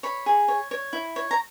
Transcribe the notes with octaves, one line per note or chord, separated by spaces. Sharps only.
C#5 B5
G#4
C#5
C#5
E4
C#5
A#5